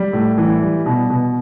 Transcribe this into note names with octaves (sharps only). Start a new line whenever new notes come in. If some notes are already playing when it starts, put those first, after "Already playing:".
Already playing: G3
A2
E3
G3
B2
B2